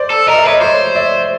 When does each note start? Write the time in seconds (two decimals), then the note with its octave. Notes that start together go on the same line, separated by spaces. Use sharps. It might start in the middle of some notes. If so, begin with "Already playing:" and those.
Already playing: C5 D5
0.10 A4
0.27 A#4 D#5
0.37 E5
0.44 B4 C#5 D#5
0.61 C5 C#5 D#5
0.95 D5 E5